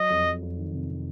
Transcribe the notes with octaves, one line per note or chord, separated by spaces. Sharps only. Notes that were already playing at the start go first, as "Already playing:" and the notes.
Already playing: F#3 D#5
F2
F#3
F2
D#3
C3
C3